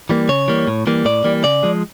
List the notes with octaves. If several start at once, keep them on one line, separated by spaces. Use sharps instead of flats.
E3 G3 A#3
C#3 C#5
E3 G3 A#3
A2
E3 G3 A#3
A2 D5
E3 G3 A#3
C#3 D5
F3 G#3